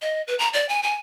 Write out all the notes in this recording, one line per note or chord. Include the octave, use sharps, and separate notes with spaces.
D#5
B4
A#5
D5
G#5
G#5